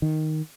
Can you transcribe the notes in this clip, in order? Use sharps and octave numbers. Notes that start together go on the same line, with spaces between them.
D#3